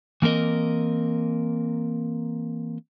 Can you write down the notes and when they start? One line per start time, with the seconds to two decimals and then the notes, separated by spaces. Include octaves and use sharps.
0.22 E3 A#3 C4 A#4 D#5